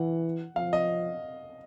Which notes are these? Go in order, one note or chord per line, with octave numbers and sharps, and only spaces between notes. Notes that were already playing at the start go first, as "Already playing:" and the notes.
Already playing: E3 F#5
F3 F5
D#5